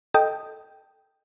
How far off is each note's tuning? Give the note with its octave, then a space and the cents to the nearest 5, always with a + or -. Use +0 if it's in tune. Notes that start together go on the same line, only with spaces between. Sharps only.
A4 +0 D#5 +0 G5 +0